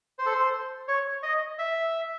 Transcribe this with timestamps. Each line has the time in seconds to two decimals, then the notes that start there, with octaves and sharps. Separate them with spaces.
0.19 C5
0.26 A4
0.32 C5
0.88 C#5
1.23 D#5
1.59 E5